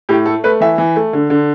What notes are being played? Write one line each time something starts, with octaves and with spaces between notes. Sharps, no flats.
A2 G4
A3 A4
A3 B4
E3 E5
E3
A3
D3
D3